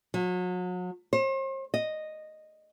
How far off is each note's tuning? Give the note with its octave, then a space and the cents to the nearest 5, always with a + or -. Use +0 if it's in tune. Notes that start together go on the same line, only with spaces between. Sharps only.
F#3 -35
C5 +40
D#5 -5